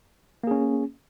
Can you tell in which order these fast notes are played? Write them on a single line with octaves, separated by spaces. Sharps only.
A#3 G#4 C#4